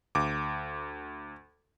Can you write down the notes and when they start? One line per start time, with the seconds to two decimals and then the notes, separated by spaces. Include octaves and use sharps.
0.15 D2 D6